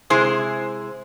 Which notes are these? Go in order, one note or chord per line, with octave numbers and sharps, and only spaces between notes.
C3 G#3 E4 G#4 C5